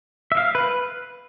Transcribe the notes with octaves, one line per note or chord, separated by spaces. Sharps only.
E5
F5
B4